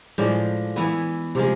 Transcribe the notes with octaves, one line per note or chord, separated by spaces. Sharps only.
A2 F3 G#3 D4
E3 B3 E4
C3 F3 G#3